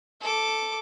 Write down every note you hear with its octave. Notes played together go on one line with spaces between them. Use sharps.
A4 D6